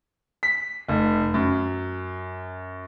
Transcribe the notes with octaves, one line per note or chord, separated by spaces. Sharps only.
B6
F1
F#2